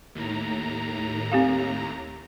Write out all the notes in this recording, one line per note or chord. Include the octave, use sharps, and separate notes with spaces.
D#2 A2 A#5
C4 G4 F5